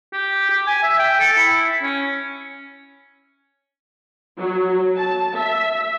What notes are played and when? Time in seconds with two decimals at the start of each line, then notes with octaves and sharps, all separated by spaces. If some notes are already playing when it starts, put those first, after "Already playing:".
0.13 G4
0.50 G4
0.67 G#5
0.83 E5
0.99 G5
1.20 A4
1.37 E4
1.82 C#4
4.39 F#3
4.97 A5
5.36 E5